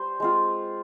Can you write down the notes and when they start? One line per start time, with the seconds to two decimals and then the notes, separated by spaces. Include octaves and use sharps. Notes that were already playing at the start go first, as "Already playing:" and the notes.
Already playing: G3 C5
0.20 G#3 C4 F4